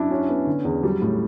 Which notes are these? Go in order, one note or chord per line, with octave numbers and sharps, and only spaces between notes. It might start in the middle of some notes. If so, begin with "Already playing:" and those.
Already playing: F#2 D4 E4
C#4 F#4
B3
D3
E2
F#3 G3
A2